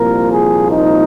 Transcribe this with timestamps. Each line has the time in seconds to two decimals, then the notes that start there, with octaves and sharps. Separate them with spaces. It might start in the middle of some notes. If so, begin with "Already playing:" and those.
Already playing: C2 A#2 F3 A#3 A#4
0.32 G#4
0.71 D#4